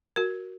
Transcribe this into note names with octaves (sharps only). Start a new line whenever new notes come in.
F#4 A#4